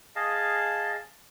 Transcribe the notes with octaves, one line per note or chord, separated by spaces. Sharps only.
G#4 D#5 F5 A5